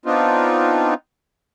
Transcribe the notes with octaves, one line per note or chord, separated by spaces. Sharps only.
B3 C4 D4 D#4 F4